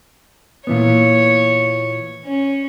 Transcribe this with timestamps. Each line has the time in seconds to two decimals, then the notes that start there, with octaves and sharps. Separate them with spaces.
0.67 A#2 E3 B3 C#5
2.25 C#4